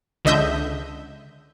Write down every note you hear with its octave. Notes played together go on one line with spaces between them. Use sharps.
C#2 D3 D#5 E5 G6